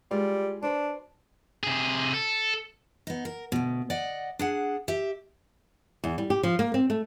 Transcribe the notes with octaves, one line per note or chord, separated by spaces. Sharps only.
G3 G#3 F4
D4 F#4 B4 C5
C3 G#4
A4
B3 D#4
A#4
D2 B2
D5 D#5 F#5
D4 G#4 F#5
G4 E5
E2
G3
G4
F3
A#3
C4
A3